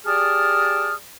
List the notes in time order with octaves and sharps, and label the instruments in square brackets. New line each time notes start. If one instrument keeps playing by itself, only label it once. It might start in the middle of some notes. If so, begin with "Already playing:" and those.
[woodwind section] G4 G#4 D5 A5 D#6 F6